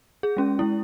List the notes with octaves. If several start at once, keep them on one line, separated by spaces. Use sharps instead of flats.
G#4
G#3 C#4
G#3 E4